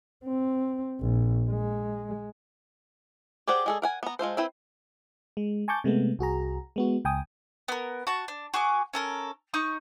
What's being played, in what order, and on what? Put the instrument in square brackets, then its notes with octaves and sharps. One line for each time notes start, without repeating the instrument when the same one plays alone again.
[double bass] C4
A#1
G#3
[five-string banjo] G4 G#4 C5 D5 F#5
G#3 G#4 A4
A#4 F#5 G#5
B3 A#5
G#3 F4 A4 C5
C4 E4 B4 G5
[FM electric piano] G#3
G#5 A5 C#6 D6 G6 A6
C3 G#3 A3 B3
C2 F#4 G#4 A#5
G#3 B3 F#4
C#2 G5 G#5 D#6
[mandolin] B3 A#4
F#4 A5
D4
F#4 G#4 G#5 D6
C#4 A4 A#4
D#4 C#6 D#6